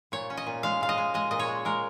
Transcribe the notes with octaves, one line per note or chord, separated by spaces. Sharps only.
A#2 C#5
C#4
D#5
A#2
G#3 F5
A#2 F5
D#5
G#3
G#3 D#5
A#2 D#5
C#5
G#3
G#3 A#4